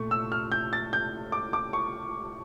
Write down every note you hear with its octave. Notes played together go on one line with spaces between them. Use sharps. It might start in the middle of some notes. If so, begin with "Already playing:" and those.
Already playing: A#2 A3 C#6
E6
F6
G6
A6
G6
D6
D6
C#6